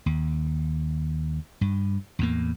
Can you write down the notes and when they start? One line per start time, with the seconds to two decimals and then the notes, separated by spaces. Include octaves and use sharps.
0.06 D#2
1.61 G2
2.19 E2 A2 A#3